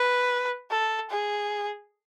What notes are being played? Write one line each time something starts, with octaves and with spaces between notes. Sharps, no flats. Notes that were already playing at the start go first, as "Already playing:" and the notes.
Already playing: B4
A4
G#4